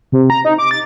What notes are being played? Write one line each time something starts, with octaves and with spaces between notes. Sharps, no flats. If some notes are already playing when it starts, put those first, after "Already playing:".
C3
A#5
D#4
D6
A6